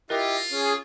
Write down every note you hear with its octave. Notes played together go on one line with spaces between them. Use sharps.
E4 F4 G4 A#4 D#5
C#4 G#4